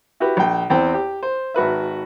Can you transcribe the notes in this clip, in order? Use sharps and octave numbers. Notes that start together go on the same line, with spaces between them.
E4 F#4 G4 B4
A#1 G5
E2 C4 G5
G4
C5
G#1 F#4 B4 E5